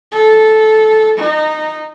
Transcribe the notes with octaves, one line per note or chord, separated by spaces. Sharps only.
A4
D#4